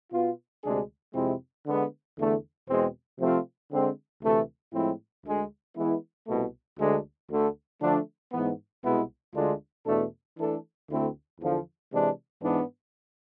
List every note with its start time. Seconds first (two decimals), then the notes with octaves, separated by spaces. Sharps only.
0.12 B2 B3 F4
0.64 D2 C3 G#3 D4 G#4
1.15 F2 C3 G#3 C4 E4
1.66 D3 G#3 B3
2.18 E2 D3 A3
2.69 E2 B2 G#3 C4
3.19 C3 F3 A3 C4 F4
3.72 D3 G#3 C4
4.23 D2 C3 E3 A3
4.74 A2 F3 G#3 C4 E4
5.25 D2 D3 G#3
5.76 E3 G#3 B3 E4
6.27 C2 B2 A3
6.79 D2 D3 G#3 D4
7.30 D2 D3 A3
7.81 D3 F3 A3 D4
8.33 G#2 E3 B3
8.84 C2 B2 G#3 B3 E4
9.35 D2 D3 G#3 D4 F4
9.86 E2 B2 A3 D4 A4
10.38 E3 A3 D4 A4
10.89 D2 D3 A3 C4 E4
11.40 E2 D3 F3
11.91 C3 E3 G#3 D4
12.42 G#2 E3 B3 D4